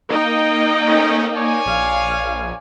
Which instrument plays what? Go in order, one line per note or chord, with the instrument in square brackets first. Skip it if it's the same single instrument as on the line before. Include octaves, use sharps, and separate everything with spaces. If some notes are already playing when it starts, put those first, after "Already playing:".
[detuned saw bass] A#3 [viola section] D#4 D#5 G5
[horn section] A3 C4 C#4
C#5 D5 G#5
[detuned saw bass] A#1 [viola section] F5